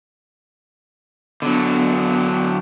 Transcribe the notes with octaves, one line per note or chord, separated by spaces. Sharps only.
D3 F#3 B3 D4